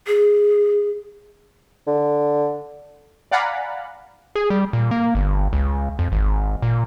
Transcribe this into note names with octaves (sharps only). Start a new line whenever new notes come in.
G#4
D3
D5 F5 F#5 G#5 A#5 B5
G#4
G3
A#2
A#3
G1
C#2
F2
G#1
A#2